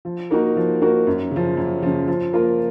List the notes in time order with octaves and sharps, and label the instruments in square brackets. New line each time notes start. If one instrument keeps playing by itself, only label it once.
[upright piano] F3
A#3 D#4 F#4 A#4
F3
A#3 D#4 F#4 A#4
F#2
C#3 F3
F#2
C#3 F3
F3
A#3 F4 A#4